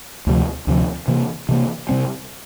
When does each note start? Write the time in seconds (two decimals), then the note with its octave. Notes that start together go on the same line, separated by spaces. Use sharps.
0.27 D2 C3 F3
0.67 D2 C3 F3
1.08 C3 E3 A#3
1.49 C3 E3 A#3
1.89 C3 G3 C4